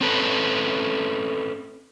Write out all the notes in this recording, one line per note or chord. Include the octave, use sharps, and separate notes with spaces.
C4 C#4 A4 B4